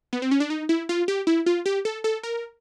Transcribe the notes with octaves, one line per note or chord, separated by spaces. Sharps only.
B3
C4
C#4
D4
D#4
E4
F4
G4
E4
F4
G4
A4
A4
A#4